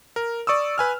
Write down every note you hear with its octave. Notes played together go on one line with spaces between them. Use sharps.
A#4
D5 C#6 D#6 E6
B4 G#5 F6